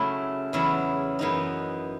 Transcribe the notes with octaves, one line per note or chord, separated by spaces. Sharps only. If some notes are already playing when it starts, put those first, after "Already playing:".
Already playing: C#3 F#3 A3 E4
E2 C#3 F#3 B3 E4
F#2 E3 B3 D#4